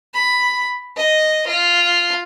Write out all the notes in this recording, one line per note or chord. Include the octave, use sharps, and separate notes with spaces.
B5
D#5
F4